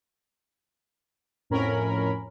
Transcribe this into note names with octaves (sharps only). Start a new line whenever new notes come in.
F2 A2 C#4 A#4 B5